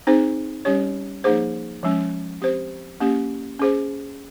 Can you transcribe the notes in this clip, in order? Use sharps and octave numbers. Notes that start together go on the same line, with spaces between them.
C4 D#4 G#4 C5
G3 C#4 G4 C#5
F3 A#3 D#4 G#4 C5
F3 G#3 C#4
C4 G4 C5
A#3 C#4 G4
C#4 G#4 C5